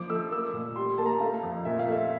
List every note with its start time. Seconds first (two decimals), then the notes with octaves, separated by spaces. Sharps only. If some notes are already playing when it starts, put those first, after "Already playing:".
Already playing: F3 D6
0.09 A3 E6
0.31 A#3 E6
0.53 A#2
0.76 G3 C6
0.98 A#3 A5
1.06 A#5
1.13 A5
1.21 A3 F5
1.43 F2
1.65 A#2 E5
1.79 F5
1.88 A3 E5